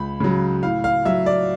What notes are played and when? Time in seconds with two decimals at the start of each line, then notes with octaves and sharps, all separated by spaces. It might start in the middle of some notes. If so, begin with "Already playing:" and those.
Already playing: C#2 B5
0.20 C#3 F#3
0.63 A2 F5
0.84 F5
1.05 F#3 E5
1.26 D5